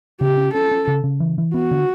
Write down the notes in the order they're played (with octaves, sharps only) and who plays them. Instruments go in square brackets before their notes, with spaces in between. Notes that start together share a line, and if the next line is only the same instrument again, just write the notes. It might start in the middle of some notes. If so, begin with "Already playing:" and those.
[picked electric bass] C#3 [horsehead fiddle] G4
[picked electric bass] C#4
[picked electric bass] C#4 [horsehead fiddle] A4
[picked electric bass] C#4
C#3
C#3
E3
E3
[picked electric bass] B3 [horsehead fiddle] F#4
[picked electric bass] D3